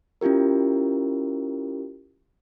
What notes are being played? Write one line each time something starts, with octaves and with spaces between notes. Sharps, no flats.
C#4 E4 F4 G4 A#4